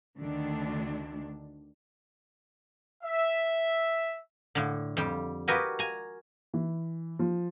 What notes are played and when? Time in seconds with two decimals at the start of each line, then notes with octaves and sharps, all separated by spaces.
0.18 D2 D3 D#3 D4
3.04 E5
4.55 A2 D3
4.97 F2 G3 G5
5.48 F#4 G4 A#4 B4 D#5 G#5
5.79 G#5 A#5
6.54 E3
7.19 F3